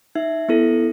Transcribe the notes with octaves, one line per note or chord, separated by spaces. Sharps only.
D#4 E5
B3 E4 A4